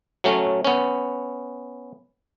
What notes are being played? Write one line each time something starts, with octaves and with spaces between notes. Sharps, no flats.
F#3 A3 C#4
B3 C#4